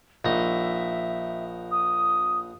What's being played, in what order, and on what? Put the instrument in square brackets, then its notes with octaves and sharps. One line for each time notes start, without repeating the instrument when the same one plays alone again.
[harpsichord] A#1 D#4 [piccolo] E5
[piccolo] D#6